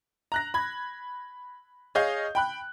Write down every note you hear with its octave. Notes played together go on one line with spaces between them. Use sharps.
A#5 F#6 A#6
B5 G#6
G#4 C#5 D#5 F5 G6
G5 B5 F#6